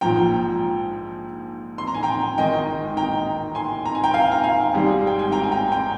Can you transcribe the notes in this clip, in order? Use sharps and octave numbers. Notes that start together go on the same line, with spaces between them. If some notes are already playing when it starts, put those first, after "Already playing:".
A#1 G#2 F3 G5 A#5
C6
A#5
G#5
G5 A#5
G#1 G#2 D#3 D#5 G5
G5 A#5
G#5 C6
A#5
G#5
G5 A#5
F5 G#5
A#5
F5 G#5
G#1 G#2 G3
G5
G#5
G5 A#5
G#5
G5 A#5
G5 A#5